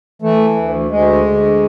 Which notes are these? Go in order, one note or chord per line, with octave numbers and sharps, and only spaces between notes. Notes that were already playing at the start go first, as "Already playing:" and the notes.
E3 A3
D2
D2 G#3
D2